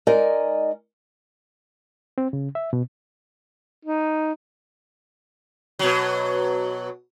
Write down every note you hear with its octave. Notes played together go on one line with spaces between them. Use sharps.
G#3 D#4 A#4 D5 D#5 G#5
C4
C#3
E5
B2
D#4
B2 F#3